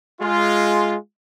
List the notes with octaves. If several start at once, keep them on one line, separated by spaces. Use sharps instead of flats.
G#3 F4